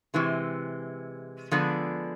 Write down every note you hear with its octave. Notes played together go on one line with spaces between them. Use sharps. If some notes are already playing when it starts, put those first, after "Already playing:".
C3 E3 G#3
D3 F3 G#3 B3 D4